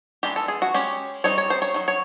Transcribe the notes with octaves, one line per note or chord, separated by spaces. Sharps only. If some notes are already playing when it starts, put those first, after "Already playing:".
E3 G#3 B3 D4 G4
A4
G#4
F#4
G#3 C#4 G4
G3 C4 D#4 C#5
C#5
C5
C#5
D#3 F#3
C#5